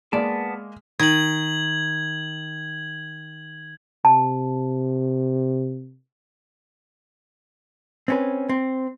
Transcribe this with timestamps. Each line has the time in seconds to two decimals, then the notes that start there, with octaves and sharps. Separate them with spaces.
0.13 G#3 A#3 B3 D5 A5
1.00 D#3 G#6 F#7
4.05 C3 A5
8.08 C4 C#4 B4
8.49 C4